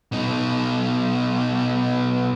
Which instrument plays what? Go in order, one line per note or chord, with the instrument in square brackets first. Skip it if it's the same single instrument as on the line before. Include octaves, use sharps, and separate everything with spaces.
[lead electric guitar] B2 D#4